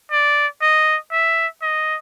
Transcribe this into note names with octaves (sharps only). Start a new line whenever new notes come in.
D5
D#5
E5
D#5